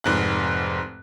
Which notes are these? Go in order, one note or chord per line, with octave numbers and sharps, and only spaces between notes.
F1 G#2 F#6